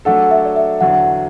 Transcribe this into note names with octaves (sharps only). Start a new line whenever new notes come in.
F#3 A3 D4 A4 F#5
E5
D5
E5
E2 D3 F#3 F#5